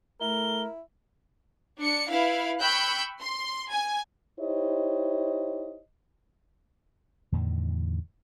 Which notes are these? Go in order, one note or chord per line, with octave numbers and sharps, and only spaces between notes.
A3 E4 A#4 G7
D4 C#7
E4 B4 F5
G5 B5 C#6 E6 F#6 G6
C6
G#5
D#4 E4 G4 C5 C#5 D#5
E2 A2 D3 D#3